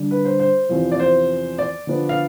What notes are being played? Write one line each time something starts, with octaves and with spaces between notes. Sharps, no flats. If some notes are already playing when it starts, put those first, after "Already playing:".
Already playing: D3 G3 D4
B4
C5
C5
E2 C3 F3
D5
C5
D5
D3 F3 B3 D4
F5